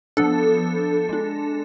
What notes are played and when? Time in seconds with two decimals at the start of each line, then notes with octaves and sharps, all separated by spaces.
0.17 F3 B3 D4 A4
1.09 G#3 D4